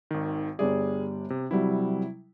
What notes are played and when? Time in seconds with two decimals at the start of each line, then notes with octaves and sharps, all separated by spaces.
0.11 G#1 D#3
0.59 G1 G3 G#4 D5
1.30 C3
1.51 C3 F#3 G3 E4